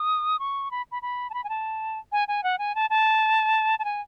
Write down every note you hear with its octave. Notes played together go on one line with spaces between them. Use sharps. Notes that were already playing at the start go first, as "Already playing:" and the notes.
Already playing: D#6
C#6
B5
B5
B5
A5
B5
G#5
A5
G#5
G#5
F#5
G#5
A5
A5
A5
G#5